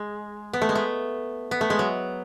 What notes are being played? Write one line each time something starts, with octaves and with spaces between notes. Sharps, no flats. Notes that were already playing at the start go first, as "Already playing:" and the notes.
Already playing: G#3
B3
A3
G#3
A3
B3
A3
G#3
F#3